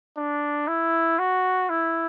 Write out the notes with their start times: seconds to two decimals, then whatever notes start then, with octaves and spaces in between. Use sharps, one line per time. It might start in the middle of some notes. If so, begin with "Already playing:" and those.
0.17 D4
0.68 E4
1.19 F#4
1.70 E4